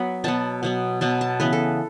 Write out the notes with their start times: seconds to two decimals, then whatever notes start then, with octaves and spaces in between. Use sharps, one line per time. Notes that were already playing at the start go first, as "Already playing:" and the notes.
Already playing: F#3 B3 B5
0.24 B2 F#3 B3 A5
0.63 B2 F#3 B3
1.01 B2 F#3 B3 A5
1.21 A5
1.40 C#3 E3 B3 B4
1.53 A4